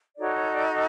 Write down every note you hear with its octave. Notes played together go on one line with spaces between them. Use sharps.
D#4 F#4 A4 C#5 D5
C#5
D5
D#5